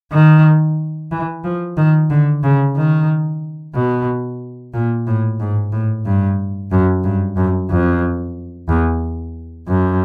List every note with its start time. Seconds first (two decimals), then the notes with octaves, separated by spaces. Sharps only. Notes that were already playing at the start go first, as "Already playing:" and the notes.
0.12 D#3
1.11 E3
1.44 F3
1.77 D#3
2.10 D3
2.43 C#3
2.76 D#3
3.75 B2
4.74 A#2
5.07 A2
5.39 G#2
5.72 A2
6.05 G2
6.71 F#2
7.04 G2
7.37 F#2
7.70 F2
8.69 E2
9.68 F#2